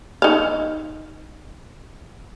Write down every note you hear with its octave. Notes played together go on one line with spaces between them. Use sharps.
D#4 F5